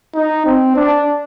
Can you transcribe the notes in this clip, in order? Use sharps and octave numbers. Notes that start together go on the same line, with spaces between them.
D#4
C4
D4